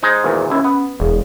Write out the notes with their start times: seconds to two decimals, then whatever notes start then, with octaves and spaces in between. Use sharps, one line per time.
0.03 G#3 D#4 C5
0.24 G#1 E2 A#2
0.50 D#2 C#4 E4
0.64 B3
1.00 E1 G#4